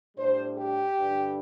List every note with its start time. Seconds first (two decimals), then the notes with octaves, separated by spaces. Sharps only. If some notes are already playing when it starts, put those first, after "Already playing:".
0.17 A2 G3 D4 C5
0.57 G4
0.97 G2 D3 G3